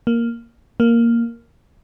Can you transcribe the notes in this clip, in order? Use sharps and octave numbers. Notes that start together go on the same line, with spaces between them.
A#3
A#3